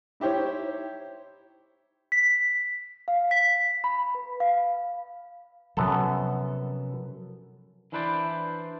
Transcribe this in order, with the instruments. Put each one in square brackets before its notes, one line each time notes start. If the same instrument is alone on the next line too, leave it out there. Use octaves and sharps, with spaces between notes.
[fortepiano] D#4 E4 G4 C5 C#5
[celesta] B6
F5
B6
B5
B4
F5
[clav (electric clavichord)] F#2 B3 A4 [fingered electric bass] C3 F3 F#3
[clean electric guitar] E3 D4 E4 B4 C5 D5